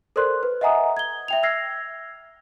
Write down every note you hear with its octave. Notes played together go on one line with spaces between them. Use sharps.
A4 A#4 C5 D5 C6 F#6
B4
D#5 E5 F#5 G#5 A#5 D#6
G#6 G7
E5 G5 F7
E6 F6 G#6 A#6 C7